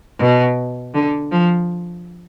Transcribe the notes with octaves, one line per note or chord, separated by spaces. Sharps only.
B2
D3
F3